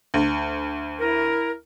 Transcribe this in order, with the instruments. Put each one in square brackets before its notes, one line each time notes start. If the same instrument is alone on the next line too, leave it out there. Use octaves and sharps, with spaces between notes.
[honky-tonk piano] D2
[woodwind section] E4 A#4